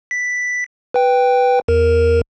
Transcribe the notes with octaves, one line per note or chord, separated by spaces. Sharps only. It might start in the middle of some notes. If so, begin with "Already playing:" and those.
B6
B4 G5
E2 A#4